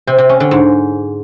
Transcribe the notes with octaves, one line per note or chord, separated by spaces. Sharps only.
C3
C3
C#4
D3
G#2